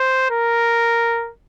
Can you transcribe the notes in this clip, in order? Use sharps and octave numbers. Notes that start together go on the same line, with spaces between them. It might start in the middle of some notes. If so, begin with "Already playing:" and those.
Already playing: C5
A#4